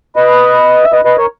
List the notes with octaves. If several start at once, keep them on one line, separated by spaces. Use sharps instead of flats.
B4 D#5
E5
B4 D#5
B4 D#5
A#4 C#5